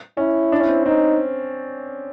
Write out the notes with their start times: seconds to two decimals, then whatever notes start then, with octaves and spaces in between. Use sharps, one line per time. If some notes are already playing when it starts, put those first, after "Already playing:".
0.17 C#4 E4
0.52 D4
0.60 C#4
0.69 C4
0.86 C4 D#4